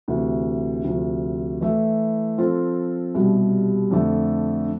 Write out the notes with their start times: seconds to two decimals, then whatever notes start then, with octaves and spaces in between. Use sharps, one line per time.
0.08 D2 C3 E3
0.84 D2 C3 F3
1.61 E3 A3 E4 A4
2.38 F3 C4 F4 A4 C5
3.15 C2 B2 G3
3.91 F2 D3 A3